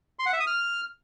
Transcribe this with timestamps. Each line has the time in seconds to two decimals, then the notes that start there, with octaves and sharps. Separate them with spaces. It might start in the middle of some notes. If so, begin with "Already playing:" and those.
0.19 C6
0.26 F#5
0.33 E5
0.40 D#6
0.47 F6